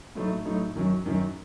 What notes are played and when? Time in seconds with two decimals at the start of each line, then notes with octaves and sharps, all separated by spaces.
0.15 A2 F#3 A3 D#4
0.45 A2 F#3 A3 D#4
0.76 F#2 D#3 F#3
1.06 F#2 D#3 F#3